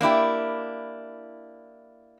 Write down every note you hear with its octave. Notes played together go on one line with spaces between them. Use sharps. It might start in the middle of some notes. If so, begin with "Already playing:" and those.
A#3 D4 E4 G4